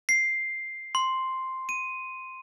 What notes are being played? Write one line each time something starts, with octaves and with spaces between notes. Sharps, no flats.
C7
C6
D#7